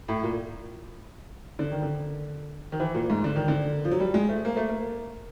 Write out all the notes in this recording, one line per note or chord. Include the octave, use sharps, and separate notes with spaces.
A2
A#2
D3
D#3
D3
D#3
E3
A#2
G#2
D3
D#3
D3
F3
F#3
G3
G#3
A3
A#3
A3
A#3